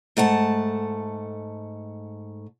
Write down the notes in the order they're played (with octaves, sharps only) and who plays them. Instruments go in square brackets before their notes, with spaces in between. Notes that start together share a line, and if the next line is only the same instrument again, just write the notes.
[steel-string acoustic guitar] G#2 A3 F#5 A5